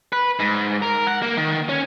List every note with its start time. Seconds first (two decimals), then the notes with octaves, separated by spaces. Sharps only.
0.12 B4
0.39 G#2
0.82 A#4
1.07 F#5
1.22 A#3
1.37 D#3
1.69 C#4